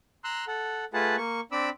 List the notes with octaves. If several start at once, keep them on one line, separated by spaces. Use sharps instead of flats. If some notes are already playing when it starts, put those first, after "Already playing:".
A#5 C6 E6 F#6
A4 F#5
A3 F4 G#4 B4 F#5 A5
A#3 C#6
C4 D4 B5 D6 E6